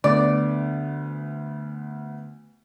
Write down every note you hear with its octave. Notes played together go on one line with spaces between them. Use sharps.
D2 D3 B3 D5